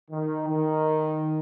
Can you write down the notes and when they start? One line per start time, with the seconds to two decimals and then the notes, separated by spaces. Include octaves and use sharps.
0.11 D#3
0.48 D#3